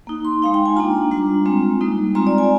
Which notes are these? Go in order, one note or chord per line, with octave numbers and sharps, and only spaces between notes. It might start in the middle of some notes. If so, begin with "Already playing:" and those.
A#3 D#4
C6
G#3 D#4 F5
G5
G#5
A#3 D4 F4 A#5
G3 D4 F4
G#3 C4 F4
G3 A#3 D#4
G#3 C4 F4 A#5
D5
G#5